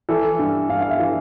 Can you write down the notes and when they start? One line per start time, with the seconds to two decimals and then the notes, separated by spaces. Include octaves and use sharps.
0.09 E3 A4
0.39 G2
0.69 G2 F5
0.81 F5
0.89 E5
1.00 E3